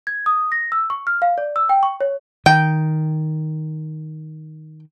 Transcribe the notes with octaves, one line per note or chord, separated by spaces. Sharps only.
G#6
D#6
A#6
E6
C#6
F6
F5
D5
E6
G5
C#6
C#5
D#3 G5